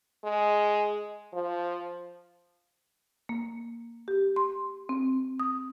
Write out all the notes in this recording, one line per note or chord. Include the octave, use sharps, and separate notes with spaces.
G#3
F3
A#3
G4
C6
C4
D#6